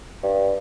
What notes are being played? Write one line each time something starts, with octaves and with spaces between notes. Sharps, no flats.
G2